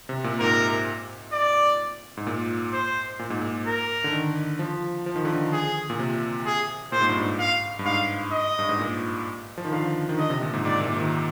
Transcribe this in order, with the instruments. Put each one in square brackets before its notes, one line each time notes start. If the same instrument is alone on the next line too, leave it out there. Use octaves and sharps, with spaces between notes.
[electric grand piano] C3
A#2
[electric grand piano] G#2 [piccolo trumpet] A#4
[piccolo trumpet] D5
[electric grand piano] G#2
A#2
[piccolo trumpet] C5
[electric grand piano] A#2
G#2
A#2
[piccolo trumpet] A#4
[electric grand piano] D3
D#3
F3
F3
D#3
D3
D#3
[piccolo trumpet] G#4
[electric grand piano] A#2
C3
[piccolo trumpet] G#4
[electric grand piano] A#2 [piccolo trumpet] C5
[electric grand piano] G#2
G2
G#2
[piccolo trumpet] F5
[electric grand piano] G2
[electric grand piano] G#2 [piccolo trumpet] F5
[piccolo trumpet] D#5
[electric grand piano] G2
G#2
A#2
F3
D#3
[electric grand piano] D3 [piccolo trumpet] F5
[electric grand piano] D#3
[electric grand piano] D3 [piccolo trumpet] D#5
[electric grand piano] C3
A#2
G#2
[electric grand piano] G#2 [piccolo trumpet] D5
[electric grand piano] A#2
D#3